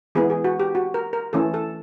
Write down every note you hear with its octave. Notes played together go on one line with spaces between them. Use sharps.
E3 G#3 B3 G#4
G#4
F#4
G4
F#4
A#4
A#4
E3 A3 C#4 A4
A4